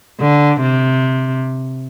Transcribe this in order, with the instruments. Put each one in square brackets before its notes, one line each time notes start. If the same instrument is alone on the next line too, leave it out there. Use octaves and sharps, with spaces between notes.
[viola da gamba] D3
C3